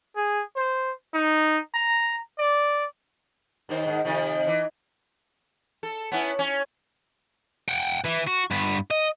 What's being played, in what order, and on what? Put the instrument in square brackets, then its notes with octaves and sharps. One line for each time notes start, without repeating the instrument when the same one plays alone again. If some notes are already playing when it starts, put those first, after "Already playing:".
[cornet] G#4
C5
D#4
A#5
D5
[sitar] D#2 D#3 C5
G#2 D#3
C3 D#3 F3
E3
A4
B3 C#4 E4
C#4
[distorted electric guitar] F#5 G5
E3
F#4
G2 B3
D#5